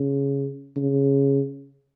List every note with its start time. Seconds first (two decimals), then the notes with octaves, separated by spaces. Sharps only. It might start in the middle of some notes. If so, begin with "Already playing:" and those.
Already playing: C#3
0.76 C#3